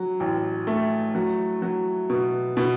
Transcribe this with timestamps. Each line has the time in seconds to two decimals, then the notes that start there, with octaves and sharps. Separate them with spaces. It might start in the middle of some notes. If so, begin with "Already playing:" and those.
Already playing: F#3
0.20 A1
0.67 A3
1.15 F#3
1.62 F#3
2.10 B2
2.57 B2